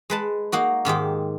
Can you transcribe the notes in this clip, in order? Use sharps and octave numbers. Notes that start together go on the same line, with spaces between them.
G#3 B4 A5
A#3 D#4 F#4
G#2 D#3 G#3 G4